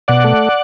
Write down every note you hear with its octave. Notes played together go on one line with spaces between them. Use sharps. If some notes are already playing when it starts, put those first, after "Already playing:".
B2 D5 F#5
A3